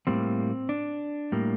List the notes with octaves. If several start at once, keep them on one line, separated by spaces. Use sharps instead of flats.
A2 G3 A#3 C4
D4
A2 G3 A#3